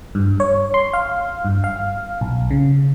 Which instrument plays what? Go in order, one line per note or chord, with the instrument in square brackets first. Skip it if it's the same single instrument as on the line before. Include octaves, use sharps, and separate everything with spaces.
[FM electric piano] G2
C#5
C6
F5
G2
F5
B1
C#3